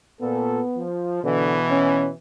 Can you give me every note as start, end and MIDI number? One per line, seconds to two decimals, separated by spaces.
0.21 0.60 46
0.21 0.85 59
0.21 0.60 69
0.77 1.23 53
1.24 2.13 47
1.24 1.58 50
1.24 2.13 52
1.71 2.09 61